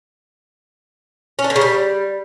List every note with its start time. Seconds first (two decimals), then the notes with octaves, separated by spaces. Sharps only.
1.39 C#4
1.44 D4
1.50 D3
1.56 C#3
1.61 G3